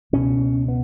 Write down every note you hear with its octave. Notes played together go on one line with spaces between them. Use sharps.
C#2 B2 C#4
B3